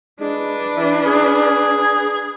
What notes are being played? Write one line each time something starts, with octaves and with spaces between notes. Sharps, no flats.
G#3 D4 B4
E3
G#4